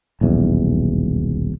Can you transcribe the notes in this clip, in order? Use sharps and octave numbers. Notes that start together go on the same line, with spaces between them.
D#1 B1 E2